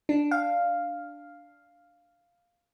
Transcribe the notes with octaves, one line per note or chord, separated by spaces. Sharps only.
D4
F5